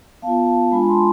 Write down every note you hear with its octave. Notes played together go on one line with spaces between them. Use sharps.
B3 F4 F5 A5
F5 A5
G#3 D4 F4 G#5 B5
A5 C6